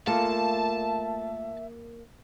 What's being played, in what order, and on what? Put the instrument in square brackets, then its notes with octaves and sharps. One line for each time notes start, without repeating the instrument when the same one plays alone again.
[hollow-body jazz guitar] A3 F4 [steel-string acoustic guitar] A#3 [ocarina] E5 [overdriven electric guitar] A5